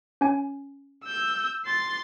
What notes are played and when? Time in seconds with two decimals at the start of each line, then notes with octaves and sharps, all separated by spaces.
0.21 C#4 G#5
1.05 E6 G6
1.66 C6 A6